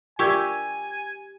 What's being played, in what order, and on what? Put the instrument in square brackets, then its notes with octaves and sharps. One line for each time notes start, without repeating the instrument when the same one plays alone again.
[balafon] F4 A#4 D5 [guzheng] G4 [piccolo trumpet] G#5 [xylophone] C#6 E6 G#6